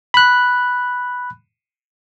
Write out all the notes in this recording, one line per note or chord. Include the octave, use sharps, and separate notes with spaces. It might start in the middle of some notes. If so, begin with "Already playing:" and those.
B5 F#6